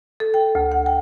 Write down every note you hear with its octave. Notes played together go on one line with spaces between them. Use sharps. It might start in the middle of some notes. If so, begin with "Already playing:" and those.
A4
G5
D2
F#5
G5